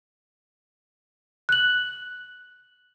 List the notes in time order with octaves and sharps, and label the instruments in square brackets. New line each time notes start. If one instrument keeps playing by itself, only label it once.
[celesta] F#6 F#7